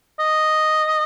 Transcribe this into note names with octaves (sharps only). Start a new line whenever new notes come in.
D#5